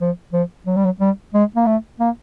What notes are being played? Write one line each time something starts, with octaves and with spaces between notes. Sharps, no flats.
F3
F3
F#3
G3
F#3
G3
G#3
A#3
A3
A#3